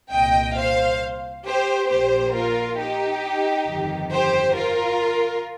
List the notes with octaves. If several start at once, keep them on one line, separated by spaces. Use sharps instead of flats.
C2 A#2 D#5 G5
C5 F5
G4 C5
A#1 A#2 G4 C5
F4 A#4
D#4 G4
G1 F2 D#3
G4 C5
F4 A#4